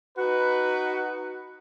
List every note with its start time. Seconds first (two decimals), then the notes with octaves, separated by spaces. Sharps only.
0.17 D#4 F#4 B4